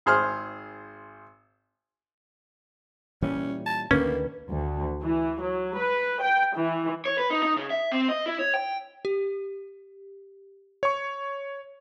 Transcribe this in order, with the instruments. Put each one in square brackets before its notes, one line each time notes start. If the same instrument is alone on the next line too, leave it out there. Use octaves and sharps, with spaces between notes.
[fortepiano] G#1 G#4 C5 F6
[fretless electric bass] A#2 E3 G3 [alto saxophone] C#4
[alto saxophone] A5
[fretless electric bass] D2 D3 D#3 [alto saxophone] A#3 [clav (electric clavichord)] C#4 [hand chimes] B4
[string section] D2
E3
F#3
B4
G5
E3
[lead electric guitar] C#5
B4
D#4
D#4
C#3
E5
C4
D#5
E4
C#5
G5
[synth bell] G4
[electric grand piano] C#5 C#6